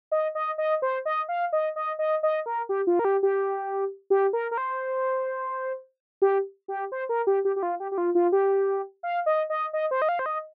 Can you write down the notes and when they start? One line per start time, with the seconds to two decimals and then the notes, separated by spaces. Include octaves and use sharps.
0.12 D#5
0.35 D#5
0.58 D#5
0.82 C5
1.05 D#5
1.29 F5
1.53 D#5
1.76 D#5
1.99 D#5
2.23 D#5
2.46 A#4
2.69 G4
2.87 F4
2.99 A#4
3.05 G4
3.23 G4
4.10 G4
4.33 A#4
4.51 A#4
4.58 C5
6.22 G4
6.68 G4
6.92 C5
7.09 A#4
7.27 G4
7.45 G4
7.56 G4
7.63 F4
7.80 G4
7.92 G4
7.98 F4
8.15 F4
8.32 G4
9.03 F5
9.26 D#5
9.50 D#5
9.73 D#5
9.91 C5
10.02 D#5
10.09 F5
10.19 C5
10.26 D#5